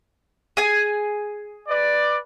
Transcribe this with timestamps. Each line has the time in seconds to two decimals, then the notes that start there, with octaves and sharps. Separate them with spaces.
0.57 G#4 G#5
1.68 B4 D5